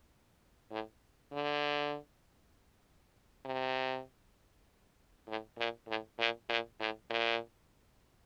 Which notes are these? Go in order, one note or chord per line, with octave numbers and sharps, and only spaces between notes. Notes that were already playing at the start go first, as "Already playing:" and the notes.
A2
D3
C3
A2
A#2
A2
A#2
A#2
A2
A#2